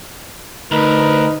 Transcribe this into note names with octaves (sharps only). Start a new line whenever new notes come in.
D2 D#4 A#4 B4